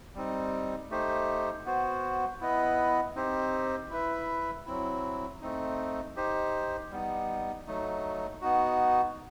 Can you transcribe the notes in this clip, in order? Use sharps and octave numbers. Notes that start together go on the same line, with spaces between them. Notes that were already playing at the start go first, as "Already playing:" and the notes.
G3 C4 D#4
A3 D#4 G4 C5
B3 F#4 C5
B3 E4 B4 D#5
C4 D#4 G4 C5
E4 B4 E5
F#3 C4 E4
A3 C4 D#4
D#4 G4 C5
G3 B3 D#4
F#3 A3 D#4
B3 D#4 F#4